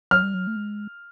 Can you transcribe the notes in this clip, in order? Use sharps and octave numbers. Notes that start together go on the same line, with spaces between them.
F#3 F6
G3
F#3
A3
G#3